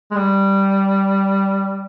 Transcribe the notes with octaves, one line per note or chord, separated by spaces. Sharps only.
G#3
G3